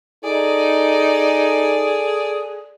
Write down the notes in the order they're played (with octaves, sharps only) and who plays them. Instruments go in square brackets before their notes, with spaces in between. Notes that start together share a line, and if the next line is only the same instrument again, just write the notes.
[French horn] D#4 [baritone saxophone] G#4 [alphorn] A4 [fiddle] D5